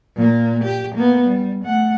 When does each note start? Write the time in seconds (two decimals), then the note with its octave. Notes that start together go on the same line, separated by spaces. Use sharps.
0.16 A#2 A#3
0.64 G4
0.95 A#3 B3
1.26 G3
1.64 A3 F#5